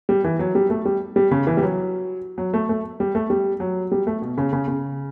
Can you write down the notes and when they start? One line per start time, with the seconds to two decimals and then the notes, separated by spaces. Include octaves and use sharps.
0.09 G3
0.24 E3
0.39 F#3
0.55 G3
0.70 A3
0.85 G3
1.16 G3
1.31 C#3
1.47 E3
1.57 G3
1.62 F#3
2.38 F#3
2.54 A3
2.69 A3
3.00 G3
3.15 A3
3.30 G3
3.60 F#3
3.92 G3
4.07 A3
4.22 B2
4.38 C#3
4.53 C#3
4.68 C#3